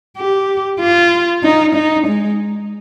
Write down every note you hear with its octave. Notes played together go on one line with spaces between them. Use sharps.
G4
F4
D#4
D#4
G#3